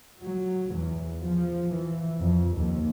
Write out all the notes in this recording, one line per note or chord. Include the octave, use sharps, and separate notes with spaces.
F#3
E2
F3
E3
F2
D#2